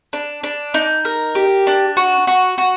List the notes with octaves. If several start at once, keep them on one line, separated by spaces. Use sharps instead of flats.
D4
D4
D#4
A#4
G4
D4
F#4
F#4
F#4